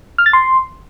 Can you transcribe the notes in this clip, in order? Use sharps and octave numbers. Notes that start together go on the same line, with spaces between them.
F6
A6
C6